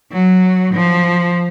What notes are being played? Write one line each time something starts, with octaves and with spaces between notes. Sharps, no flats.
F#3
F3